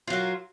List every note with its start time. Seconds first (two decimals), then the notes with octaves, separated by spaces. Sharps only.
0.08 F4
0.10 F#3
0.13 A#4